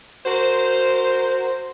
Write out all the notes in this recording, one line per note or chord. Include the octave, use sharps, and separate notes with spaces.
F#4 A#4 C5